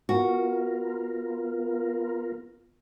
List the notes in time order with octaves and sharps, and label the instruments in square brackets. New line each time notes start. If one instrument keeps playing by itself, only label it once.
[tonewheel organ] B3 F4 A#4 [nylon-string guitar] F#4